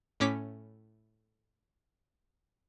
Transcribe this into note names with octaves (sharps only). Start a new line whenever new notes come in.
A2 C#4 D6 B6